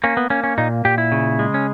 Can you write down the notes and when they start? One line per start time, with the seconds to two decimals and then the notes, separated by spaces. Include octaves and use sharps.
0.04 A#3 C#4
0.17 B3
0.30 A#3 C#4
0.44 C#4
0.58 A#2 D#4
0.85 A#2 G4
0.98 E4
1.12 C#3
1.39 G#3
1.54 C#4